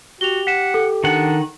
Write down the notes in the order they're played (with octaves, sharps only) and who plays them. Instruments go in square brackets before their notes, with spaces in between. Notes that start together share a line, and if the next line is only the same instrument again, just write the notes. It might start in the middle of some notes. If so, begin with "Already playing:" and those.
[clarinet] F#4 [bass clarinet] G4 [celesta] F7 G7
[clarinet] F#5 [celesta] B6 E7
[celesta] A4
[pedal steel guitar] D#3 F#5 [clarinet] D4